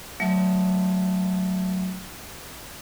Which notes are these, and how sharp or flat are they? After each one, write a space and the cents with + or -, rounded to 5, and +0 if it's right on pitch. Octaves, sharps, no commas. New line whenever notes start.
F#3 +0 A3 +0 E5 +0